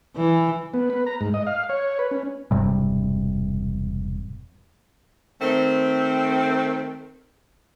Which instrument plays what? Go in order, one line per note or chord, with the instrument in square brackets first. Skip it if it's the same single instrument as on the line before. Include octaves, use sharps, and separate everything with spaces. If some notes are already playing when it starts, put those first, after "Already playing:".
[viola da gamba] E3
[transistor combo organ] B3
B4
A#5
G#2
D#5
F5
C#5
B4
C#4
[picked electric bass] E1 G2 C3 G3
[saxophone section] D#3 A3 C4